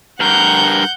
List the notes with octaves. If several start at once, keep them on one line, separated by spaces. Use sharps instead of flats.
G2 A#4 F#5 G6